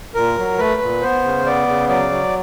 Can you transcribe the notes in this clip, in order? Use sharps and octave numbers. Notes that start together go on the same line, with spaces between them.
A#2 A#4
F#3
A3 B4
A#2
B3 C5
C#3
B3 D5
C#3
F#3 D5
F#3